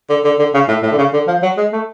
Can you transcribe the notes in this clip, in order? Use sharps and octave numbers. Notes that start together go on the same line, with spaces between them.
D3
D3
D3
C#3
A2
A2
D3
C#3
D3
F3
F#3
G#3
A3